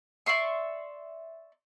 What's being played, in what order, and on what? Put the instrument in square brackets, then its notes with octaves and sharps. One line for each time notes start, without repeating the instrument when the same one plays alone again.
[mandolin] D5 E5 C6 C#6